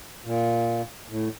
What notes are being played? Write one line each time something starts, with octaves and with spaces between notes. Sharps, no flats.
A#2
A2